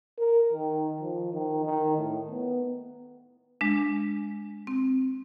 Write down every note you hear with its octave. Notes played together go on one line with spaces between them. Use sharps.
A#4
D#3
F3
D#3
D#3
A2
B3
G#3 D4
C4